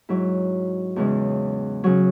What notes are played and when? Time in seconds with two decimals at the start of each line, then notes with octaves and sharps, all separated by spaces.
0.09 G#2 F#3 E4
0.96 E2 C#3 E3 G#3
1.84 C#3 F#3